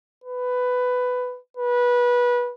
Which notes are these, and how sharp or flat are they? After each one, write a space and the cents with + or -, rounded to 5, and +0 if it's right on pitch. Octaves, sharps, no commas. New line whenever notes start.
B4 +10
B4 -20